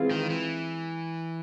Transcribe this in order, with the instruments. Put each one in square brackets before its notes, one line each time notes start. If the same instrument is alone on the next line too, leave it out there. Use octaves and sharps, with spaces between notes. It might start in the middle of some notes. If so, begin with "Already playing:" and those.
Already playing: [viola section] E3 G#3 C4 F4 G#4
[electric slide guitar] D#3
E3